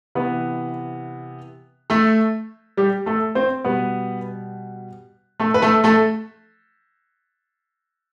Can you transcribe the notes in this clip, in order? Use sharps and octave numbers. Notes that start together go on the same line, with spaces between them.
C3 E3 B3 B4
A3 A4
G3 G4
A3 A4
C4 C5
B2 G3 B3 B4
A3 A4
B4
A3 A4
A3 A4